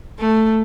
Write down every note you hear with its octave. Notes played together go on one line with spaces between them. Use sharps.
A3